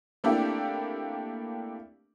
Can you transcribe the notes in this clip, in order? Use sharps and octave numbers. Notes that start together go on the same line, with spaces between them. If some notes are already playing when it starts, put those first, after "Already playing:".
A3 A#3 C4 D4 E4 G4